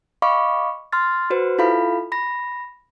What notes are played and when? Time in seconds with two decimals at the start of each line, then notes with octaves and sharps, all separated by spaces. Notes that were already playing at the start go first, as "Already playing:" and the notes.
0.22 D#5 F5 B5 C#6 D6
0.92 C6 F6 A6
1.30 F#4 B4 C5
1.58 E4 F4 A4 F5 B5
2.12 B5 A#6